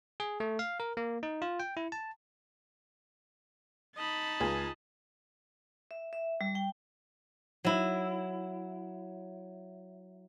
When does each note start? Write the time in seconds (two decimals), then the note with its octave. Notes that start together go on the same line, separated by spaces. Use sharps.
0.20 G#4
0.40 A3
0.59 F5
0.80 A#4
0.97 A#3
1.23 D#4
1.42 F4
1.60 G5
1.77 E4
1.92 A5
3.96 D#4 D#5 A5 B5
4.40 C#2 F4 G#4
5.91 E5
6.13 E5
6.41 G3
6.55 G5
7.65 F#3 E4